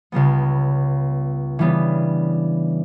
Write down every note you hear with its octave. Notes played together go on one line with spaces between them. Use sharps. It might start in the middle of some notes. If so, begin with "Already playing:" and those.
C#2 C#3 G3 B3
C#3 E3 G3 B3 D4